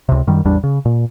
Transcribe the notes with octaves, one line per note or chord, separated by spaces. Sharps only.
C#2 C3
F#2 D#3 G3
A1 E2 G3 D4
C#3
A#2